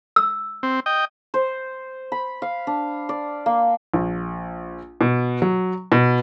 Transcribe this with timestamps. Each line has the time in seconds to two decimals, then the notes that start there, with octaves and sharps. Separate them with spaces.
0.16 E6
0.63 C4
0.86 D#5 G5
1.34 C5
2.12 B5
2.42 F5
2.67 D4
3.09 D5
3.46 A#3
3.94 A#1
5.01 B2
5.42 F#3
5.92 B2